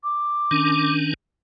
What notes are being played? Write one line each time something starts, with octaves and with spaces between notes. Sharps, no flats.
D6
D#3 C#4 D4